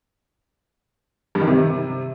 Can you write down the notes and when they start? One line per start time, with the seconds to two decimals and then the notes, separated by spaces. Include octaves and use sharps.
1.35 G2
1.41 D#3
1.47 C3